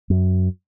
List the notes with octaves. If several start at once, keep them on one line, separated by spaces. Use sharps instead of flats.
F#2